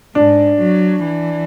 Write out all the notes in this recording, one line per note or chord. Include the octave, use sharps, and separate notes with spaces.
G#2 D4
F#3
E3